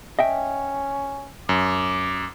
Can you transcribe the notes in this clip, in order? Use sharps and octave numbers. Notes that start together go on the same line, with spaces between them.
C#4 D#5 E5 G5
F#2 D6